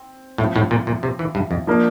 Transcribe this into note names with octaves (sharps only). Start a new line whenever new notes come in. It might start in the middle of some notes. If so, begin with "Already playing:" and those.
Already playing: C4
A2 F3 C4 E4
A2
A#2
A#2
C3
E3
G2
F2
F3 A#3 D4